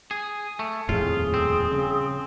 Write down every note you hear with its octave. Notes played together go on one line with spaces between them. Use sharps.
G#4
A3
D#1 F2 A2 F4 G#4
C4
C#3